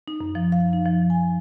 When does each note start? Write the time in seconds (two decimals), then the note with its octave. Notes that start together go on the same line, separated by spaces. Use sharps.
0.08 D#4
0.21 F#2
0.35 F3
0.52 F5
0.73 D#4
0.85 F3
1.10 G#5